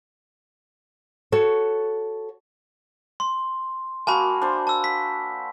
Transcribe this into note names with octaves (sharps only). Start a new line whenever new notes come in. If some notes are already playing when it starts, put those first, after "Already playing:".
F#4 A4 C#5
C6
A#3 F#4 D#5 G#5 A5 B5
D4 C5
A5 E6
B6